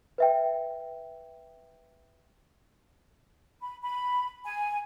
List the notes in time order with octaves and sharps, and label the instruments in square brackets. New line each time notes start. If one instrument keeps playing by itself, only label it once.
[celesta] B4 E5 G5
[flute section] B5
B5
G#5